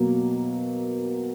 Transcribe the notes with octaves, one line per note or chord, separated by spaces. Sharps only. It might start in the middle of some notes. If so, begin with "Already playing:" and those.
Already playing: B2 F#3 A#3